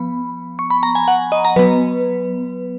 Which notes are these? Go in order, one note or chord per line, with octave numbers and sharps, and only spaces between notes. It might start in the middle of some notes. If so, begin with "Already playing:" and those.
Already playing: F3 B3 B5
C#6
B5
A#5
G#5
F#5
D#5
A#5
F#3 B3 B4